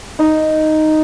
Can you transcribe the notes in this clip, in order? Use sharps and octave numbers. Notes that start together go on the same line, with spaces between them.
D#4